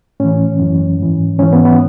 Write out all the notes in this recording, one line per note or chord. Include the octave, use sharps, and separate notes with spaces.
A2 E3 C#4
F#2 E3
G#2 E3
G#2 E3 C#4
B3
B3